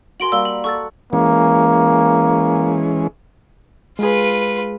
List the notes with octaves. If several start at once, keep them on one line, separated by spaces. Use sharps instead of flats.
F#4 A#4 G#5 C6 D7 F#7
G3 A#3 E6 G7
F#7
A4 F#5 C#6 E6 A6
E3 G#3 A#3 C#4
G#3 F4 G#4 B4